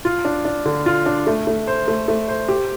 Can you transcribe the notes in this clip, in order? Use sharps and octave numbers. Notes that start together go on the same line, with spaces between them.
F4
D4
D4
D3
F4
D4
A3
A3
C5
A3
A3
C5
G4